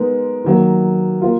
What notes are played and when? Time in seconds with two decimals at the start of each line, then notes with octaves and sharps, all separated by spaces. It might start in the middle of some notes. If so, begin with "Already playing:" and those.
Already playing: G#3 B3 D#4 A#4
0.44 D#3 F#3 A#3
1.21 A#3 F4